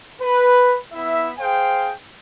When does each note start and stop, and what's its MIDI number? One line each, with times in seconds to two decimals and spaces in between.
0.22 0.77 71
0.94 1.32 59
0.94 1.32 64
0.94 1.32 76
1.39 1.93 68
1.39 1.93 72
1.39 1.93 77
1.39 1.93 79